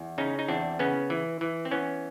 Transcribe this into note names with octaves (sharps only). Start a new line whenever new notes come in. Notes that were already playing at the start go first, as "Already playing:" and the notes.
Already playing: E2
C#3 C#4 D#4
D#4
E2 C4 D4
C#3 B3 C#4
E3
E3
C4
E3 B3 C#4